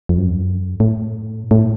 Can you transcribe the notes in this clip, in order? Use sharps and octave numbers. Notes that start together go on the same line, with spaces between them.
F2
F#2
F2
F#2
A2
A2